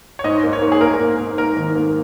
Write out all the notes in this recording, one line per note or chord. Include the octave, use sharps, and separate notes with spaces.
C#5
G#2 D#5
A#3
C#5
A#3
G#4
A#3 A#4
G#2
A#3
A#3 A#4
D#3
A#3